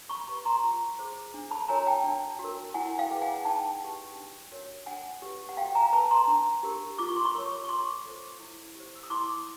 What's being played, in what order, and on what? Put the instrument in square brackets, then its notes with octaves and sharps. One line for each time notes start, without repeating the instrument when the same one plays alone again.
[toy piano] B5 C#6
G4 B4 B5 C#6
A#5 C6
F4
G#4 C5
D4
A5 B5
F#4 A#4 C#5 G#5 A#5
G5 A5
D4
F#4
A#4
E4 F#5 G#5
F5 G5
G#4 B4
F#5 G#5
D#4 G5 A5
G4 B4
D4
F#4 A#4 C#5
D4 F#5 G#5
G4 B4
F#5
F#4 F5 G5
G#5 A#5
B4 A5 B5
A#5 C6
D4
G4 A#4
F4 D6
C#6
C6
B5 C#6
A#4 C#5
C#6
F4 C6 D6
A4 C5
E4
G4 C5
E6
D#6
E4 C6 D6